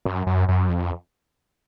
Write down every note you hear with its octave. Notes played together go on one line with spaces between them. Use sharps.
F#2
F#2
F#2
F2